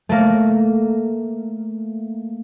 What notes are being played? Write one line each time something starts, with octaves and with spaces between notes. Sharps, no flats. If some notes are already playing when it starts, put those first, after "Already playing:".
A3 A#3